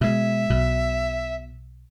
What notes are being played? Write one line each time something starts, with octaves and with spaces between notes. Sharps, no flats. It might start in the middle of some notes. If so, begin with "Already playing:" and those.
B2 G#3 E5
B1 B2